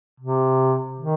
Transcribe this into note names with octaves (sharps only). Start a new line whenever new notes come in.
C3
D#3